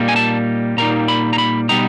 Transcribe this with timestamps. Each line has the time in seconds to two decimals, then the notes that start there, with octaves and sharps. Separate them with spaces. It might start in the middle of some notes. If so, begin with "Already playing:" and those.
Already playing: A#2 G3 A#3 D#4
0.08 G#5
0.16 A5
0.77 A#2 G3 A#3 D#4 A#5
1.08 B5
1.33 A#5
1.38 B5
1.69 B2 G3 B3 D#4 A#5